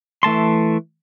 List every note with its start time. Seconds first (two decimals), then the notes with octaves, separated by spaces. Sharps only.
0.23 E3 A3 A5 C6